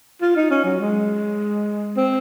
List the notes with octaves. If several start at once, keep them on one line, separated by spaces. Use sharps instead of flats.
F4
D#4
C#4
F#3
G#3
C4